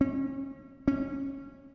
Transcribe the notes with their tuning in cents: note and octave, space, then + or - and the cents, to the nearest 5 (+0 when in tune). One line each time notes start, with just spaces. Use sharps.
C#4 -35
C#4 -20